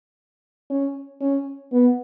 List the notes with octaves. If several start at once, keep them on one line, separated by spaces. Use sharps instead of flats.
C#4
C#4
B3